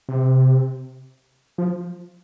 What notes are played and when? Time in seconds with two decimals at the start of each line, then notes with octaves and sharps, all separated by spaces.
0.09 C3
1.58 F3